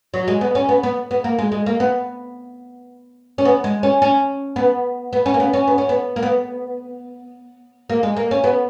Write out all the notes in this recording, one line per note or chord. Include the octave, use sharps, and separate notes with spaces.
F#3
G#3
B3
C#4
B3
B3
B3
A#3
G#3
G#3
A#3
B3
C#4
B3
G#3
C#4
C#4
B3
B3
C#4
A#3
B3
C#4
B3
C#4
B3
A#3
B3
A#3
G#3
A#3
C#4
B3